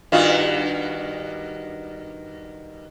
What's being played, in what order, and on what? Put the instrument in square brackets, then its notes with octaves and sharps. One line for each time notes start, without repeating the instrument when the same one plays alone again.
[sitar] G2 D#3 F#4 [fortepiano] F4